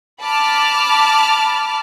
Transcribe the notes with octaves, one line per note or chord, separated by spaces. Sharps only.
A5 B5 D6 F6